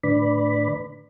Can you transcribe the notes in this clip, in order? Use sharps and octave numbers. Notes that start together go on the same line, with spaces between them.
A2 D3 B4 D5 B5